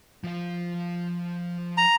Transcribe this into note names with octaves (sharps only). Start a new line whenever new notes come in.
F3 F5
A#5